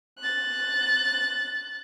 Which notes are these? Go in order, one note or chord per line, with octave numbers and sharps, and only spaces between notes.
F#6 A6